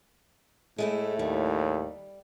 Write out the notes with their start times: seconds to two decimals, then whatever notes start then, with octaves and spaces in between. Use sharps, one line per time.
0.78 A2 G#3 A3 E4
1.19 D#2 G3